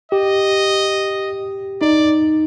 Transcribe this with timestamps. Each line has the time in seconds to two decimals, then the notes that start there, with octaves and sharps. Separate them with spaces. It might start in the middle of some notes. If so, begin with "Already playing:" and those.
0.12 G4 D#5
1.81 D#4 D5